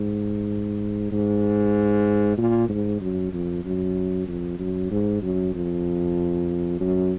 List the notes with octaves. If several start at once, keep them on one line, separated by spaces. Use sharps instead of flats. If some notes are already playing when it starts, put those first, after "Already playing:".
Already playing: G#2
G#2
A#2
G#2
F#2
F2
F#2
F2
F#2
G#2
F#2
F2
F#2